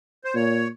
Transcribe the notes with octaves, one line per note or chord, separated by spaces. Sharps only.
C5
A#2 C#5